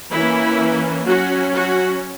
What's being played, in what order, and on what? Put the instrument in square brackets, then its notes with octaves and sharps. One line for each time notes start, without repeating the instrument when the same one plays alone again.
[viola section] E3 A#3 C#4 E4
F#3 C#4 F#4
F#4